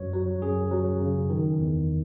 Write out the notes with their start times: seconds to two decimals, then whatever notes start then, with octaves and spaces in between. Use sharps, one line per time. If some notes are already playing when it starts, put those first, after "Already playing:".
Already playing: F#2 F#3 C#5
0.13 F#3
0.42 F#2 G#4
0.71 F#3
1.00 C#3
1.30 D#3
1.58 E2